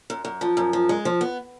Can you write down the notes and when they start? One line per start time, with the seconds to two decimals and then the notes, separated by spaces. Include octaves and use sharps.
0.10 F#2
0.25 F#2
0.41 F3
0.57 F#2
0.73 F3
0.89 G#3
1.05 F3
1.21 B3